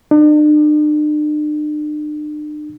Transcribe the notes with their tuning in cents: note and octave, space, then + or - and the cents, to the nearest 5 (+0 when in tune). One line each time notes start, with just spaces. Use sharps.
D4 +45